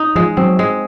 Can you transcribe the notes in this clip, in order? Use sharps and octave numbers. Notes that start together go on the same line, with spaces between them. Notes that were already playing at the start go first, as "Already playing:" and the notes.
Already playing: D#4
F3 G#3
F#3 C4
G#3